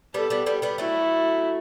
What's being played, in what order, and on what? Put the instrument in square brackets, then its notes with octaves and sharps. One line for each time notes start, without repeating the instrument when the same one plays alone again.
[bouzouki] G3 B3 [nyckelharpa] A4
[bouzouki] G3 B3
G3 B3
G3 B3
[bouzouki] F#3 A3 [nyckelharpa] E4